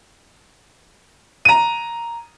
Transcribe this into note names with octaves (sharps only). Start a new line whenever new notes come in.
A#5 D#7